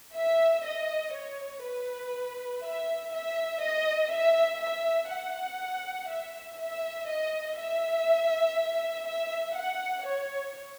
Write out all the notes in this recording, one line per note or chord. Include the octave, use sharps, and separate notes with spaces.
E5
D#5
C#5
B4
E5
E5
D#5
E5
E5
F#5
E5
E5
D#5
E5
E5
F#5
C#5